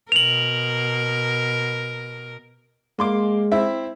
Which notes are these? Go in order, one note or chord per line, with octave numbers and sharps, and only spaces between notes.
B2 A#4 F7 F#7
G#3 A#3 C6 D6
C4 E4 E5